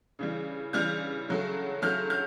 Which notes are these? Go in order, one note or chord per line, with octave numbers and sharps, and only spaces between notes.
C#3 E3 G3
C#3 E3 G3 F6 G6
C#3 F#3 A3
C#3 F#3 A3 F6 G6
F6 G6